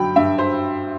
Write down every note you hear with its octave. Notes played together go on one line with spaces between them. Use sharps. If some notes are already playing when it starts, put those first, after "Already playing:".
Already playing: G2 D3 F#3 G5 B5
G2 E5
C5